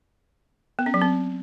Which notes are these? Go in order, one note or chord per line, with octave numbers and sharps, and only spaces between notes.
B3
C#4
F#3
C4